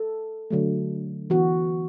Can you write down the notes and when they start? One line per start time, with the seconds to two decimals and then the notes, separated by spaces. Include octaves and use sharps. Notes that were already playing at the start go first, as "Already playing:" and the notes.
Already playing: A4
0.51 D3 F#3 A3
1.30 E3 B3 F#4